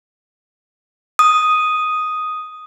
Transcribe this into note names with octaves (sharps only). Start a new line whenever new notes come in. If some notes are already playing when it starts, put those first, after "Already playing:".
D#6